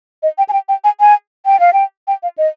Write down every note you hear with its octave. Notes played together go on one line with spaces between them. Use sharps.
D#5
G5
G#5
G5
G5
G#5
G#5
G5
F5
G5
G5
F5
D#5